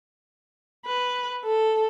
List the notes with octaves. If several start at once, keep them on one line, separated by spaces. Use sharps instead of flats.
B4
A4